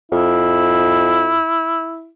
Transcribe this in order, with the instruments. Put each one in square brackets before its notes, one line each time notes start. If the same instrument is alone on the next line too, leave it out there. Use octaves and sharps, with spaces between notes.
[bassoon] F2 [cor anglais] E4